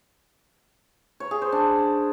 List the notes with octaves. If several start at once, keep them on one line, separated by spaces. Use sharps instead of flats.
C#5
G#4
C5
D4